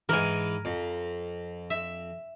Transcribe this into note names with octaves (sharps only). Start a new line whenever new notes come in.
G#2 E3 A#4 G#5
F2
E5